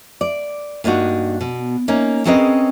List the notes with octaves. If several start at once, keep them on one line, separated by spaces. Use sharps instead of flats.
D5
G2 A#3 D4 D#4 F#4
B2
A#3 C#4 D#4
C4 C#4 G#4 A#4 B4 D#5